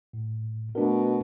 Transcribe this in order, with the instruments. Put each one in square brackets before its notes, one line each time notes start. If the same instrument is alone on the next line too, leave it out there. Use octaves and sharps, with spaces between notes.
[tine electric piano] A2
[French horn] B2 [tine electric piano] A3 D4 A#4